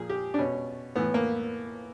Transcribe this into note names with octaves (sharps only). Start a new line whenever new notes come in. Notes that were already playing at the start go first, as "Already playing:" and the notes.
Already playing: A#2 F3 G#4
G4
D4
B2 C#4
A2 E3 B3
A#3